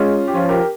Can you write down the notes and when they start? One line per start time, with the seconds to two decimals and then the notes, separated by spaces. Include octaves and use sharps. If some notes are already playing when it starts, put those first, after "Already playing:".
Already playing: G#3 C#4 F4
0.28 G4
0.34 F3 C#4 F4
0.49 G4 A#4